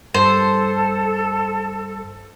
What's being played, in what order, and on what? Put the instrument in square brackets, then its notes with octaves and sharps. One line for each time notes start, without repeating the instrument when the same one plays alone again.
[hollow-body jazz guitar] G2 [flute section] A4 [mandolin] C5